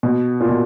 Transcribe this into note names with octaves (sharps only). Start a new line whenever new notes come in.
B2
A#2
B2